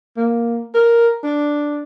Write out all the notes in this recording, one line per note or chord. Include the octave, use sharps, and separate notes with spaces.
A#3
A#4
D4